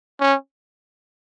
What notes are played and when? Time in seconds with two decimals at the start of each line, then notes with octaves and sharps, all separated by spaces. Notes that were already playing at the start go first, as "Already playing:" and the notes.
0.21 C#4